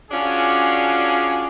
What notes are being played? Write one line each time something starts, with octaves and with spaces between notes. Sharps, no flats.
C#4 D4 F4 F#4 G#4